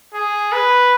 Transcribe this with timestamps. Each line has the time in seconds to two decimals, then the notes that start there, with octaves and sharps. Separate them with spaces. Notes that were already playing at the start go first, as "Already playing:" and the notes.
0.14 G#4
0.52 B4